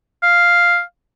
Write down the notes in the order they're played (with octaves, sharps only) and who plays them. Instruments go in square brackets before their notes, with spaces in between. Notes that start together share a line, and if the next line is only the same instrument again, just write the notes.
[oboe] F5